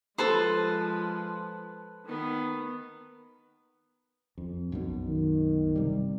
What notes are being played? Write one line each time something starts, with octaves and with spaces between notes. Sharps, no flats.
F3 G#3 A4 B4 C5
D#3 B3
F2
B1 F#2 B2
D#3
G1 C3 G3